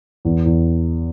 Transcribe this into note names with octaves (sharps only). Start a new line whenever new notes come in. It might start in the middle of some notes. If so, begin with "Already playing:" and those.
E2
E2